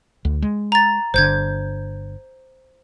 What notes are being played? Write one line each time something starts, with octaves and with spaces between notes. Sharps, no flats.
D2
G#3
A#5 A6
G1 D3 C5 G6 G#6